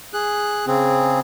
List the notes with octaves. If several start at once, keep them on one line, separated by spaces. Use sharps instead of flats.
G#4 F#6
C#3 C4 G#4